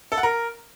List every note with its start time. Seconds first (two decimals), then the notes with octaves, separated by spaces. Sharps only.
0.12 A4
0.17 F#5
0.23 A#4